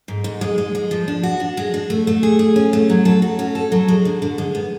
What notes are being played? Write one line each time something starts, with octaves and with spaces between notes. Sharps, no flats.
G#2
G#2
G#3
G#3
G#3
F3
D4
F#4
D4
G#3
D4
A3
A3
G#4
G#4
C#4
A3
F#3
A4
F#4
C#4
A4
F#3
G#3
D3
D3
G#3
B3